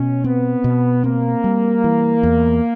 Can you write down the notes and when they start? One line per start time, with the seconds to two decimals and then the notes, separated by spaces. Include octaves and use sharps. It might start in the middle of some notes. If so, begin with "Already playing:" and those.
Already playing: B2 C#4
0.24 B3 C4
0.64 B2
1.04 A#3 C4
1.44 G3
1.84 E3
2.23 E2